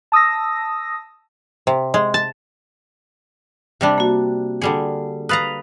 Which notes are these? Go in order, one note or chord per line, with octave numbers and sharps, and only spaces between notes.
A5 D#6 E6 A#6
C3
G#3
A5
C3 G3 D4
A#3 F#4
D3 G3 G#4
B4 F5 A#5 D#6 A6